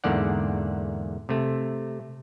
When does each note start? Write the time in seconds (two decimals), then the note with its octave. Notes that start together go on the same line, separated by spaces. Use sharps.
0.04 E2 G#2 D3 A#3 D5 F#5
1.29 C3 A3